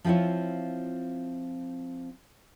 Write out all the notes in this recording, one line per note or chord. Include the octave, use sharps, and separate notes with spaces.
F3 C4 E4 F4 C#5